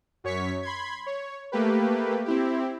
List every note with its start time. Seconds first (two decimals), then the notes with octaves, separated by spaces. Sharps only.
0.24 F#2 C#5 C#6 B6
0.63 B5 C6 G#6
1.06 C#5
1.52 A3 A#3 G4 B4
2.25 C4 E4 G4